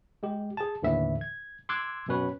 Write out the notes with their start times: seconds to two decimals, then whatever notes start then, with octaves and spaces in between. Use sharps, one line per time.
0.23 G#3 G4
0.57 G#4 A5
0.82 D#2 A2 D3 E3 E5
1.21 G#6
1.69 C6 D6 E6 F#6 G#6
2.08 F#2 B2 C#4 B4 C#5